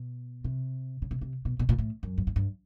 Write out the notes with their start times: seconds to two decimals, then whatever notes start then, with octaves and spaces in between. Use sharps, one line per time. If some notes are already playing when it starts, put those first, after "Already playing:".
Already playing: B2
0.44 C3
1.02 C#3
1.11 C3
1.21 C3
1.45 B2
1.59 B2
1.69 A#2
1.78 A2
2.03 F#2
2.18 G2
2.27 G#2
2.36 G2